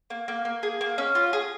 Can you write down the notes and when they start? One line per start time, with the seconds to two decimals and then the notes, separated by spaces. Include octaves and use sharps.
0.10 A#3
0.28 A#3
0.45 A#3
0.63 G#4
0.81 A#3
0.98 C#4
1.15 F4
1.33 G#4